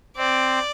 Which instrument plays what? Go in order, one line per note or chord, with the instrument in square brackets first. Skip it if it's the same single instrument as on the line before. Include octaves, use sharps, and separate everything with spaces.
[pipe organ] C4 [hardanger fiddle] D5